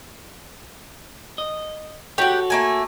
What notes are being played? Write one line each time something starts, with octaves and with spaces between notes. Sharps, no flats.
D#5
F#4 G4 A4 C#5 F#5
A3 A#3 G#5